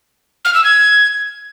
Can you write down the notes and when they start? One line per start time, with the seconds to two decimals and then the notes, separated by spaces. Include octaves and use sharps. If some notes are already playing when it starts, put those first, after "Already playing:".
0.45 F6
0.54 E6
0.64 G#6